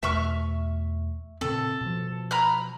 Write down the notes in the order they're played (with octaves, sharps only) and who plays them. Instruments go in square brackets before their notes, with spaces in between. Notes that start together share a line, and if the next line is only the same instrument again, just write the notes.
[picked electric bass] E2 B2 A3 [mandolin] E5 C#6 F6
[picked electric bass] A#2 C#3 C4 [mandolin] A4
[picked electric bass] B2 F3
[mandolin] A#5 B5 F6